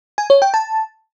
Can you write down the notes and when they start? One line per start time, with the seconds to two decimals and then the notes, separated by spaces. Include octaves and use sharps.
0.18 G#5
0.30 C#5
0.42 G5
0.54 A5